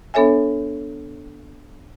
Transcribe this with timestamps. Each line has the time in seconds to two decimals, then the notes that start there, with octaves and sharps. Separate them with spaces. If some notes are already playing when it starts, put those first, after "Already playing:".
0.14 B3 D4 A4 C#5 E5 G#5